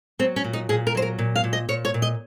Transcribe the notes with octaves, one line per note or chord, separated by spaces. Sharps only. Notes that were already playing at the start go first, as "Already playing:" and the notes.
F#3 C4
C#4
A#2
D#4
A#2 G#4
A#4
F#3 C5
A#4
A#2
F5
A#2
D#5
A#2 C#5
C#5
A#2
D#5